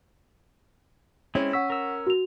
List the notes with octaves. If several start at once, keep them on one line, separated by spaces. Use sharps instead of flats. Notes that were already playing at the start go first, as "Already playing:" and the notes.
G#3 C4 C#4 E4
F#5 C#6 E6 B6
A#4 E6
F#4 F7